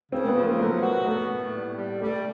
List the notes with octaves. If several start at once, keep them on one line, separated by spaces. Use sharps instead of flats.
C#3 C4
A#3
B3
F3
A#3
F#3 A3
F#4
A3 B3
A2
G3
G3
G3 A3